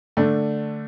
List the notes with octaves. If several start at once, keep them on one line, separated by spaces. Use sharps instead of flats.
D3 A3 D4